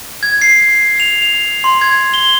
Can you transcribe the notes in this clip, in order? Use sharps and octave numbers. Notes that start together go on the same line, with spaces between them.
G#6
C7
F7
F7
C6
G#6
G7